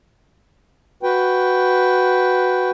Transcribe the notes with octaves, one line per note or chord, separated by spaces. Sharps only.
F#4 B4 G5